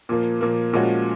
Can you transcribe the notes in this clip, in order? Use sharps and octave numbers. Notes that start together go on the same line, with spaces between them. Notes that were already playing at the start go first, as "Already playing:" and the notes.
A#2 F3 A#3
A#2 F3 A#3
A#2 F3 G#3 C#4 F#4